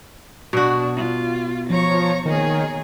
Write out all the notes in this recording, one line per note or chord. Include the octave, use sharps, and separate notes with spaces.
B2 D4 F#4
F4
F3 C#5 A#5 C#6
D#3 A#3 G#4 C#5